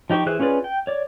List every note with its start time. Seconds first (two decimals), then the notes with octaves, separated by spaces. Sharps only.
0.10 F3 D#4 G4 C5 C#6
0.26 E3 G#4 C5 F#6
0.40 C#4 F4 G#4 B4 D5
0.64 G5
0.87 C#5 D5